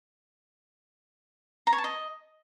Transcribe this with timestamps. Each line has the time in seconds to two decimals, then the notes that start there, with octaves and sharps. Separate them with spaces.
1.67 A#5
1.73 C#5
1.78 A5
1.84 D#5